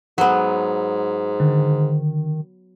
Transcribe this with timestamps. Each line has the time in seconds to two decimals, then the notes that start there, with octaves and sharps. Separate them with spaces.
0.18 G#2 F#3 B3
1.40 D3 D#3